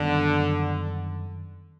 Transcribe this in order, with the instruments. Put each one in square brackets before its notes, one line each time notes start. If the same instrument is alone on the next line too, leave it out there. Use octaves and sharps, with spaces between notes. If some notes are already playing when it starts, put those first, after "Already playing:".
Already playing: [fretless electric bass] F#2 D#3 G3 B3 [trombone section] D3